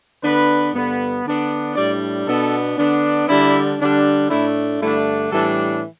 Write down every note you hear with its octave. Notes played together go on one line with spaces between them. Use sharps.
D3 B3 D4 B4
G2 D3 B3
D3 B3 D4
A2 G3 D4 D5
B2 B3 D4 A4
D3 B3 D4
D3 G3 D4 E4
D3 G3 D4
A2 A3 D4 E4
G2 D3 A3 D4 E4
A2 E3 G3 D4 A4